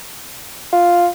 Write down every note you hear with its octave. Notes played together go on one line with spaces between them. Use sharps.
F4